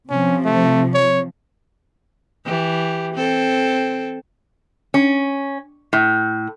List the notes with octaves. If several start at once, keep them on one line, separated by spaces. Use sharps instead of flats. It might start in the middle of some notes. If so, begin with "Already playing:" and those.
C3 F3 C#4
A3
C#5
E3 G4
C4 A4
C#4
A2